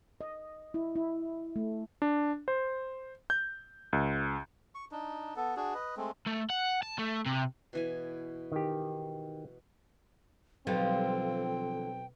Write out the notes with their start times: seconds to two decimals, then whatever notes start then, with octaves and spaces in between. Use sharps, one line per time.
0.21 D#5
0.74 E4
0.96 E4
1.56 A3
2.02 D4
2.48 C5
3.30 G6
3.93 C#2
4.75 C#6
4.91 D4 D#4
5.36 B3 A4
5.56 D4 F#4 G#4
5.74 B4 D#5
5.97 G#3 A3 C4
6.27 A3
6.50 F#5
6.83 A5
6.98 A3
7.26 C3
7.73 B2 E3 G#5
8.52 D#3 G4
10.67 B1 D3 F3 G3 C4 G5